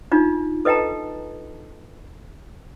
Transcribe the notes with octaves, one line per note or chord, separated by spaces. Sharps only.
D4 D#4 F4
A4 B4 D#5 G5 A5 A#5